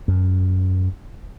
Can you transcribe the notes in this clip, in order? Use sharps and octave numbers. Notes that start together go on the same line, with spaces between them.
F#2